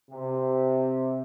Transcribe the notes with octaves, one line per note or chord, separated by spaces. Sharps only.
C3